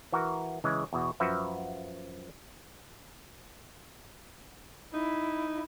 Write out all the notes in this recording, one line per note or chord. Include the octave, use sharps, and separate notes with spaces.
E3 F#4 A#4
C#3 E3 G#3
E2 B2 F#4
F#2 F3 F#4 B4 E5
D#4 E4